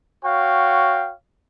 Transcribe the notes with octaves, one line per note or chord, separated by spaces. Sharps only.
F#4 C#5 F5 G5